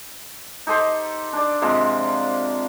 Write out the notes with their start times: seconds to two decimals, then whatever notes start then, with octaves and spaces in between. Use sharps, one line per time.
0.67 D#4 G4 A4 C5
1.33 D4 D5
1.62 C3 F3 G#3 A#3